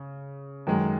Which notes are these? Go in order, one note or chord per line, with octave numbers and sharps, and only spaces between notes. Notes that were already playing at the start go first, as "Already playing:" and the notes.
Already playing: C#3
F#2 D#3 G#3